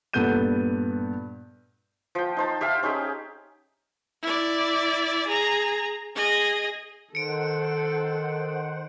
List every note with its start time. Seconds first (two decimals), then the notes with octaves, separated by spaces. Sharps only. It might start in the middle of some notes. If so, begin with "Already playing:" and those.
0.13 G2 A#2 B3 A4 G6 D#7
2.15 F3 G5
2.37 D#4 C5 A5
2.61 G4 E5 F5 A5
2.83 C#4 D#4 G4 G#4
4.22 E4 D5
5.27 G#4 A#5
6.15 G#4 D#5
7.15 D#3 A4 C5 F#5 C#7 D7